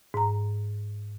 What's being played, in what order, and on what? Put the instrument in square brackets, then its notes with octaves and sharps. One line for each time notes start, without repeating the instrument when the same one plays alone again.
[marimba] G#2 A#5